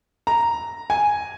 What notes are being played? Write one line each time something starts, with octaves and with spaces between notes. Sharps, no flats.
A#5
G#5